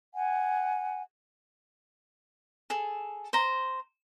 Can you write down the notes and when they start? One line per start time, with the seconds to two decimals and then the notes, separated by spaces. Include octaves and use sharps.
0.14 F#5 G#5
2.70 G#4 A4
3.33 C5 A#5